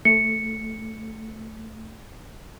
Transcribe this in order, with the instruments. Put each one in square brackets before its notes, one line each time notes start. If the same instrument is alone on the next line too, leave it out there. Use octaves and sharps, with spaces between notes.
[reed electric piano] A3 [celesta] C#7